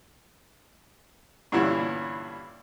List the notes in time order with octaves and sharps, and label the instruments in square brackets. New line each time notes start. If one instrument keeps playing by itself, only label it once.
[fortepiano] G2 A#2 D3 E3 C#4 E4